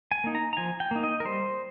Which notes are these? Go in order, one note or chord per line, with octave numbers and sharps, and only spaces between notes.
G#5
A#3 D#4
A#5
A#5
F3 G#5
G5
A#3 D#4
D#5
A#4
G3 C5